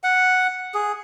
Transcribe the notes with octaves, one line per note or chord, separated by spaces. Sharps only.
F#5
G#4